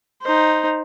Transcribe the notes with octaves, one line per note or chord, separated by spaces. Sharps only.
D#4 C5